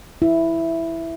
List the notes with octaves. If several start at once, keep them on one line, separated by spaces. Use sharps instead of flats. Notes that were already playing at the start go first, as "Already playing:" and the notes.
E4